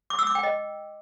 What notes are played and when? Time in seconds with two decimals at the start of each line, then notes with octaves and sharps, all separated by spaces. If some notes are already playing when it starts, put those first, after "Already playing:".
0.10 D6
0.19 E6
0.27 D6
0.35 G5
0.43 D#5